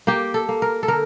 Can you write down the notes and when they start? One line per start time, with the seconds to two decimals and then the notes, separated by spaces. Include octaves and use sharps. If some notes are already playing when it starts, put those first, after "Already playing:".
0.07 A#3 G4
0.34 A4
0.49 A#3
0.62 A#4
0.83 A4
0.88 D3 A#4